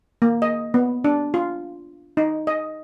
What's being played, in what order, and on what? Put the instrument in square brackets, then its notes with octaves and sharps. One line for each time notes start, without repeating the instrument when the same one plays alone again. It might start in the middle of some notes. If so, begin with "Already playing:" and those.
[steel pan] A#3
D#5
B3
D4
F4
D#4
D#5